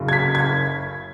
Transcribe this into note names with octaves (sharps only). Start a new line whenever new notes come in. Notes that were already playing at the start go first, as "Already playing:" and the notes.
Already playing: F#1 F#2 C#3
G#6
B6
G#6